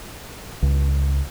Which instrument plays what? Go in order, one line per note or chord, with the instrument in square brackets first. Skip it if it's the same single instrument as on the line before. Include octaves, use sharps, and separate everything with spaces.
[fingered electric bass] C#2